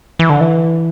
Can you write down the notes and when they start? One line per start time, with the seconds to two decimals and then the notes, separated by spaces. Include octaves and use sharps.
0.19 E3
0.30 D3
0.41 E3